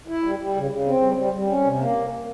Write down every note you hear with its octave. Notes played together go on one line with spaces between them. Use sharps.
E4
G3
G3
C#3
C#3
C4
G3
G3
G3
C#4
C3
A#3